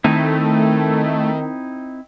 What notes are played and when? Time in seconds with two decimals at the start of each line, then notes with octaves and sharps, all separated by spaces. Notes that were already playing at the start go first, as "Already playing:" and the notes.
0.04 D#3 A3 C4 D#4 E4